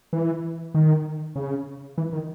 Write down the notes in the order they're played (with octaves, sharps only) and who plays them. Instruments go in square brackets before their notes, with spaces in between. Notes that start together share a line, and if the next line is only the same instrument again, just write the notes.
[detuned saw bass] E3
D#3
C#3
E3
D#3